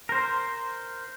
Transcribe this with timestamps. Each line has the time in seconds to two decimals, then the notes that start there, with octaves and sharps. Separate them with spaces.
0.09 A#4 C5